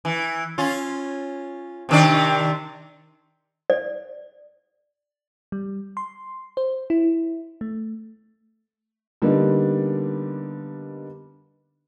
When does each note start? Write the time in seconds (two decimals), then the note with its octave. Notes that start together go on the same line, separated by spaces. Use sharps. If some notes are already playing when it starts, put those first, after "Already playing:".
0.05 E3
0.58 C#4 F4
1.89 C3 D#3 D4
3.70 D5
5.52 G3
5.97 C6
6.57 C5
6.90 E4
7.61 A3
9.22 D3 G3 A#3 B3 D4 D#4